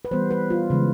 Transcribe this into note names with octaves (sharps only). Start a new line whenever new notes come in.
B4
E3 G3 B3 C5
B4
F4
C#3 E3 G#3